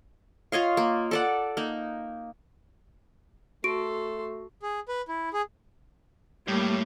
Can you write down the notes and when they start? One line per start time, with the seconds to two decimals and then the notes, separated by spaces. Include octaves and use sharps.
0.52 F4 C#5 D#5 F5
0.77 A#3
1.11 A4 D5 F#5
1.57 A#3 D#4
3.64 A3 F#4 A4 C6 D7
4.62 G#4
4.88 B4
5.08 E4
5.33 G#4
6.48 A2 G3 A#3